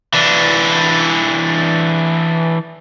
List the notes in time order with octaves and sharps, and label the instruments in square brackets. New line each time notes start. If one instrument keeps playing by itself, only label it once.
[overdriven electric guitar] E3 D4